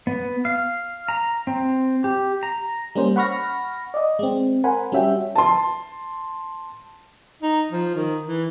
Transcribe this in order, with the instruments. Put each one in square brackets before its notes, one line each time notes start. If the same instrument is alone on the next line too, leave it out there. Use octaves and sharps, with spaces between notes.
[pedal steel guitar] B3
F5
A#5
C4
G4
A#5
[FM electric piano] G3 A#3 C#4 C5
F#5 B5 C#6 F6 A#6
D5 D#5
G#3 C4
A#4 C5 F#5 G#5 B5
G3 C#4 F#4 E5 G5
[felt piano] A5 C6
[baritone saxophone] D#4
F3
D#3
E3